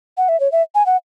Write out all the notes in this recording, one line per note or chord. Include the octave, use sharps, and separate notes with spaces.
F#5
E5
C#5
E5
G#5
F#5